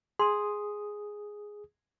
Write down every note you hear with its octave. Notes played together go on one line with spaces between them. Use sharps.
G#4 C6 D#6